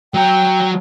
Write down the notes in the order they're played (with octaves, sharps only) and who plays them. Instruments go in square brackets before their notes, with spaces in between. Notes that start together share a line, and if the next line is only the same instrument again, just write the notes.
[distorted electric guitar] F#3 A#5 [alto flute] G5